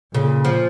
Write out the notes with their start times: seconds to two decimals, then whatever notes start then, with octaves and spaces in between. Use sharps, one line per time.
0.14 A#2 C#3
0.45 F3